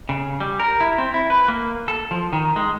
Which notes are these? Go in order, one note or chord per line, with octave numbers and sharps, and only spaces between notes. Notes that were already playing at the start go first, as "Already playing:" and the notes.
C#3
G3
A#4
E4
C4
E4
B4
A#3
A4
F3
D#3
G#3